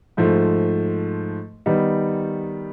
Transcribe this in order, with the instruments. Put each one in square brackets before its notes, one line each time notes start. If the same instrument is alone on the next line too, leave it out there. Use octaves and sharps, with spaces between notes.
[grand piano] G#2 F3 A3
D#3 G3 B3 D#4